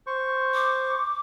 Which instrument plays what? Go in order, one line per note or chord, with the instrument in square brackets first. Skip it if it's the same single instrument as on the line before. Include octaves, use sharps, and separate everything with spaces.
[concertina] C5 C#6
[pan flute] D6